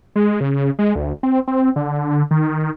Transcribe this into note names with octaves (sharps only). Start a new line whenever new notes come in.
G#3
C#3
G#3
D2
C4
C4
D3
D#3